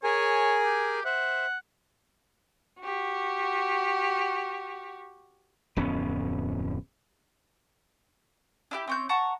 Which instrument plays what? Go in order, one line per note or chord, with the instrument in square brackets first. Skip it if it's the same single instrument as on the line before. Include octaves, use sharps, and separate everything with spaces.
[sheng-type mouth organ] G#4 A#4 G#5 [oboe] C#5
[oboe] G4
[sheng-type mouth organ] C5 E5 [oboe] F#5
[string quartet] F#4 G4
[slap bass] D1 F2 B3 C#4
[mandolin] D4 E4 G4
C4 C#4 G6
F#5 A5 A#5 C#6